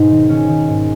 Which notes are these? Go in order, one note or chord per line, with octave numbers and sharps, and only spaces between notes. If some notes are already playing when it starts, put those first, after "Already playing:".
Already playing: G#2 B2 D#4
D#3
D#3 C#4
D#3
G#2